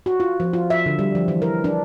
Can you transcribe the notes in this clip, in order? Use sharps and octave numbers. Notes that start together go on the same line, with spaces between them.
F#4
F4
F3
F4
E5
D3
G3
F3
E3
A#4
D4